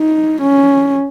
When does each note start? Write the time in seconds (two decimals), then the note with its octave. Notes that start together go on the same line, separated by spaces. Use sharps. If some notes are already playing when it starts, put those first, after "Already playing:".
Already playing: D#4
0.42 C#4